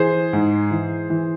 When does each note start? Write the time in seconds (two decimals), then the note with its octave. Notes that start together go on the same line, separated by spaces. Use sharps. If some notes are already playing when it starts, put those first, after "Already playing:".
Already playing: E3 G#4 C5
0.33 G#2
0.71 E3
1.10 E3